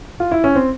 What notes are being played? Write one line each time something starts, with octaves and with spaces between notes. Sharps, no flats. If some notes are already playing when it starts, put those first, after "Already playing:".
F4
E4
C#4
C4